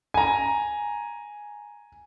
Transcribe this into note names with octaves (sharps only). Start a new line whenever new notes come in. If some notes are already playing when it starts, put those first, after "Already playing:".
G#5 A#5